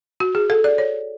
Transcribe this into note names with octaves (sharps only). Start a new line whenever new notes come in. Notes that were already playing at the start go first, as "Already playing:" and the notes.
F#4
G#4
A4
D5
C#5